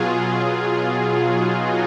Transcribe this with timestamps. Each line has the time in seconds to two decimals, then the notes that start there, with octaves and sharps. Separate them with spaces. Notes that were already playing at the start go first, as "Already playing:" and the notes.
Already playing: B2 F#3 F4 G#4
0.47 B2 F#3
1.30 D#4 F#4